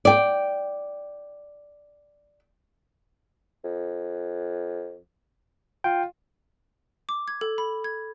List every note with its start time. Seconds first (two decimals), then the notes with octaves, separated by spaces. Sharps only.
0.05 D5 G5
3.64 F2
5.84 F4 G5
7.09 D6
7.28 G#6
7.41 A4
7.58 B5
7.84 G#6